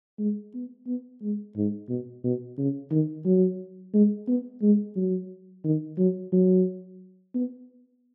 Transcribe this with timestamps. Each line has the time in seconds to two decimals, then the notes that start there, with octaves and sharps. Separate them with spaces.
0.19 G#3
0.54 B3
0.87 B3
1.22 G#3
1.56 G#2
1.89 B2
2.24 B2
2.58 C#3
2.91 D#3
3.25 F#3
3.94 G#3
4.28 B3
4.62 G#3
4.96 F#3
5.65 D#3
5.98 F#3
6.33 F#3
7.34 B3